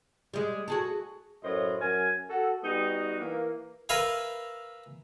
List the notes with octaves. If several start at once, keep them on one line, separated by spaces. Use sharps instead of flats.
G3 G#3
F#4 G#4 A4
F#2 A2 C5 D#5
F#2 A#4 G#5
F#4 A4
G3 B3 D#4 F#4
E3 A#3
A#4 B4 E5 F5 G#5